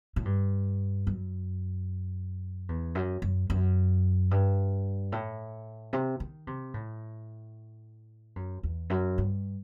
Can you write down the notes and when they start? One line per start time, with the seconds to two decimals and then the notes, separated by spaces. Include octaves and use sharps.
0.16 A2
0.25 G2
1.07 F#2
2.69 E2
2.95 F#2
3.22 F#2
3.50 F#2
4.31 G2
5.12 A2
5.93 C3
6.20 D#3
6.47 C3
6.74 A2
8.36 F#2
8.63 E2
8.90 F#2
9.18 G2